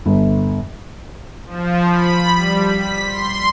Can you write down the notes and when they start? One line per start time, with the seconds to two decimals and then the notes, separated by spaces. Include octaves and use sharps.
0.06 G1
1.46 F3
1.90 B5
2.34 G3
2.70 B6
3.06 C6